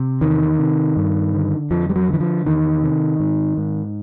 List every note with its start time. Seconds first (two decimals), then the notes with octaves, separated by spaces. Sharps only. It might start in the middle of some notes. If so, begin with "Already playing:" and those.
Already playing: C3
0.21 E2 D#3
0.59 C3
0.97 G2
1.33 D3
1.71 F2 F3
1.90 G3
1.96 F#3
2.09 D3 E3
2.20 F3
2.45 E2 D#3
2.83 C3
3.20 G#2
3.57 G#2